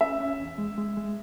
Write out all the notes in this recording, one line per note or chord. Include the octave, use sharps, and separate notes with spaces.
C#4 E5
C#4
E2
G#3
G#3
G#3